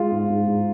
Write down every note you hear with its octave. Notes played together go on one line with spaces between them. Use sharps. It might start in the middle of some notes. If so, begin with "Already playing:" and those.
Already playing: G#3 F4
G#2
G#2
G#2